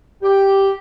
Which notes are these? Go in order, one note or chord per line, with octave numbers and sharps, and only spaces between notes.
G4